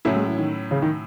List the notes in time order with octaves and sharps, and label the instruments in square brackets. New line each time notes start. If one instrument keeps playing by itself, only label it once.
[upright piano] A2 F#3 C#4 E4 [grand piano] A3
[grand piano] G#3
E3
D#3
C#3
D#3